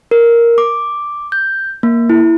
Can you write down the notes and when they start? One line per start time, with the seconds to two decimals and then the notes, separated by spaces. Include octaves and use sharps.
0.11 A#4
0.58 D6
1.32 G6
1.83 A#3
2.10 E4